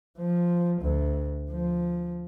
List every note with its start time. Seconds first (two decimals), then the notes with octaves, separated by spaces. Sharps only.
0.18 F3
0.82 D2
1.51 F3